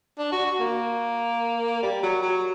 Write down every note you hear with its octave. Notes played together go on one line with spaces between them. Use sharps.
D4
F#4
F#4
A#3
G3
F#3
F#3